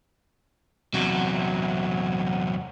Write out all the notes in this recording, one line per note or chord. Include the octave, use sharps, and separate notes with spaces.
E2 C3 F#3